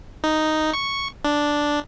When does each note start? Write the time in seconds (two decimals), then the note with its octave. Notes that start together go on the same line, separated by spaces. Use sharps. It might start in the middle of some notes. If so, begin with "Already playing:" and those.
0.24 D#4
0.73 C#6
1.25 D4